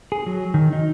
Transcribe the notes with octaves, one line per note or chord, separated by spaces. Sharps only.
G#4
F#3
D#3
D#4